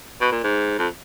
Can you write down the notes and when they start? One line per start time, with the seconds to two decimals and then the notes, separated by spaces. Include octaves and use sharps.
0.21 B2
0.32 A#2
0.43 G#2
0.78 F2